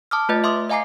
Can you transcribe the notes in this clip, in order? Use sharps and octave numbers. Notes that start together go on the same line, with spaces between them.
A5 D6 D#6 F6
A3 F4 B4 D#5 A6
E5 C6 D6 D#6
D#5 F5 G#5 A#5 D6 C7